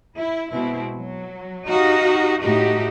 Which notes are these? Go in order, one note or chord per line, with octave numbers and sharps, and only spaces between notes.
E4
B2 G#3 C4 E4
F#3
D#4 F#4 G4 F5
A2 A3 D#4 F#4 G4